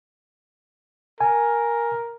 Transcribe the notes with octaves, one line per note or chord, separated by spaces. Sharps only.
A#4 G#5